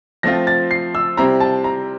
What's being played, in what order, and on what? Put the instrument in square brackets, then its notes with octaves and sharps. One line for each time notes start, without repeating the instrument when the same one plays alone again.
[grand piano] F3 A3 C4 F4 [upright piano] A#6
[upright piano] A6
C7
E6
[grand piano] C3 G3 C4 E4 [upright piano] A#5
[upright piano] A5
A#5